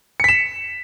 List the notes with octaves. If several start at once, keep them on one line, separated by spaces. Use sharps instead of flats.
B6 C#7 E7